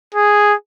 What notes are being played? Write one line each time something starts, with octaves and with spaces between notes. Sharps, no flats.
G#4